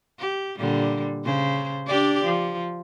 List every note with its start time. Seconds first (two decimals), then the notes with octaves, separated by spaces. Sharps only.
0.19 G4
0.59 A#2 D3 G3
1.25 C#3 C5
1.87 D4 G4 D5
2.24 F3